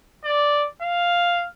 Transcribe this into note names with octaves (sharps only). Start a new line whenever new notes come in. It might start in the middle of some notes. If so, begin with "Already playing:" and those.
D5
F5